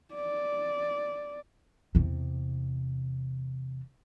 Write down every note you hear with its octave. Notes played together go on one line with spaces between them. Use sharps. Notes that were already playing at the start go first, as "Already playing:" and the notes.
D5
E2 C3